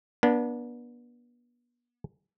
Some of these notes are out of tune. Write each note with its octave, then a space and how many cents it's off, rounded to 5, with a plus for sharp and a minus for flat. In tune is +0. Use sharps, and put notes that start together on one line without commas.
B3 -35 D4 +0